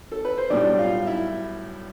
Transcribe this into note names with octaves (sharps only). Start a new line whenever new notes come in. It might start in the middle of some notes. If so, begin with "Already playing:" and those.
A4
B4
C5
B1 A2 G3 D4 D5
F4 F5
E4 E5